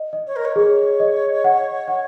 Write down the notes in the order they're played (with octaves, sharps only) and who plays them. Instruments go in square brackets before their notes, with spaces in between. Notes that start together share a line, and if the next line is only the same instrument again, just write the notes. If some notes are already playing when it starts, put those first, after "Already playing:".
Already playing: [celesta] D#5
D#5
[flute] C#5
A#4
C#5
[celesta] G#4 [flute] C#5
[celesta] D#5
F#5
F#5